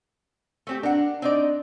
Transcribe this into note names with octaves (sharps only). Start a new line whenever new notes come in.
A3 C4 G4
D4 A#4 F#5
C4 D#4 D5